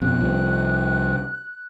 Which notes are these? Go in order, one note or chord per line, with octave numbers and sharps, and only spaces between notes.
F2 B2 F#6
C2 F3